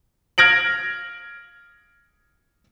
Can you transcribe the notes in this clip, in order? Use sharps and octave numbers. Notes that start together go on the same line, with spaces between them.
F6 G#6 A#6 D7 F#7